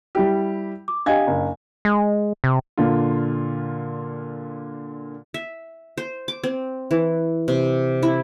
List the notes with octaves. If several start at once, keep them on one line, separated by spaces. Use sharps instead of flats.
G3 E4 G4
D6
D4 G4 D#5 F5 G#5 G#6
F#1
G#3
C3
A#2 D3 F4
E5
C5
D6
C4
E3
C3
E4